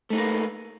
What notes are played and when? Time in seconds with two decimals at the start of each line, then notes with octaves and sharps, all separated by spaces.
0.10 A3
0.13 D#4
0.15 A#3
0.18 B4